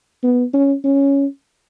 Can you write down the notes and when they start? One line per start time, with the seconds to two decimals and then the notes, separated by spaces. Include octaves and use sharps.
0.23 B3
0.54 C#4
0.84 C#4